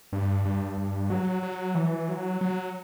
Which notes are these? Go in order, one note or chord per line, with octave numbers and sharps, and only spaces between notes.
G2
G2
G2
F#3
F#3
E3
F#3
F#3